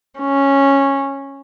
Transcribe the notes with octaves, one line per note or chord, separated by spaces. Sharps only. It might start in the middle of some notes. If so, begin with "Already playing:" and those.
C#4